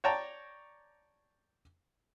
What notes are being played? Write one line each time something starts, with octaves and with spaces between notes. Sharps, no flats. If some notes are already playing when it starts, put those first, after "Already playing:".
C#5 D5 G5 A5 A#5